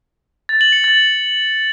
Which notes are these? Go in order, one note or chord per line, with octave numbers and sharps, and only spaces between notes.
A6
F#7
C#7
A6